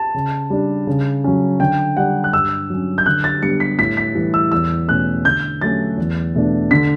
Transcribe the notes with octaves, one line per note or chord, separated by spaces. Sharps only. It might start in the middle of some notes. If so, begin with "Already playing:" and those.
Already playing: A5
C#3
G3 D4
C#3
F#3 C#4
D3 G5
G3 D4 F#5
F#6
G2 E6
F#3 C#4
G6
D3 F#6
A6
G3 B3 D4 C#7
B6
A2 B6
B6
E3 G3
E6
E2 E6
B2 A3 C#4 F#6
D3 G6
F#3 A3 C#4 A6
E2
B2 A3 D4
D3 B6